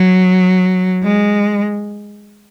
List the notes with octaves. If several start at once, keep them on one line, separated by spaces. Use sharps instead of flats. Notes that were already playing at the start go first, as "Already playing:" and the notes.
Already playing: F#3
G#3